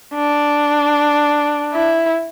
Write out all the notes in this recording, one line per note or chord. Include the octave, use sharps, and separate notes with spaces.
D4
E4